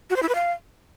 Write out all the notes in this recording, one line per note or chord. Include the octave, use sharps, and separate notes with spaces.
F#4
C5
E4
B4
F5